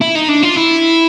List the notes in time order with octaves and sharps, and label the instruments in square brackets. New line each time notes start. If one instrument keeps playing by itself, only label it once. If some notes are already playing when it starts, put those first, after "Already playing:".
[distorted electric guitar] E4
D#4
D4
F4
E4